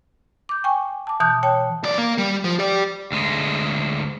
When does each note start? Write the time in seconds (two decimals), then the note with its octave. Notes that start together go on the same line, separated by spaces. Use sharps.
0.49 D6 G6
0.64 G5 G#5 C#6
1.07 A5 D6
1.20 B2 E3 A5 D#6 F#6 G6
1.43 C#5 G5 A5
1.83 B1 D5
1.98 A#3
2.18 G3
2.45 F3
2.59 G4 D5
3.12 D2 G#3